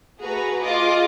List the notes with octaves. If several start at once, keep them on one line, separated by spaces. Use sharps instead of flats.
A3 F#4 G#4 B4 A#5
F4 G#4 D#5 D6